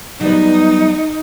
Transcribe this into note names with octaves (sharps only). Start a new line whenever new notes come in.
F#3 G3 B3 D#4